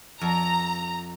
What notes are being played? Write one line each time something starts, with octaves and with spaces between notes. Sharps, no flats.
F2 A#5